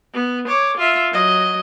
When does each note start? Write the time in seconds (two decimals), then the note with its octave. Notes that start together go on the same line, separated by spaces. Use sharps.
0.13 B3
0.48 C#5 D6
0.77 F4 E5
1.12 F#3 D#5